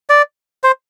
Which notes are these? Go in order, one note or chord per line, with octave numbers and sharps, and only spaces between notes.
D5
C5